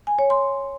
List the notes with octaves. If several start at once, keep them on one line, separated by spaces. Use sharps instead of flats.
G#5
C#5
C6